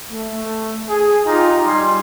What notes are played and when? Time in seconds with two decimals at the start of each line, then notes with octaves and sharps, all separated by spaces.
0.11 A3
0.88 G#4
1.25 D#4 F4 G4 A#5
1.65 G3 D#4 G#5 C6